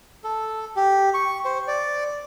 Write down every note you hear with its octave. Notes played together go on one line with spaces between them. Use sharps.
A4
G4
C#6
C5
D5